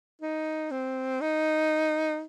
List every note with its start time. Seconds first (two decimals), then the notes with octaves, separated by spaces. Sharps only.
0.22 D#4
0.71 C4
1.21 D#4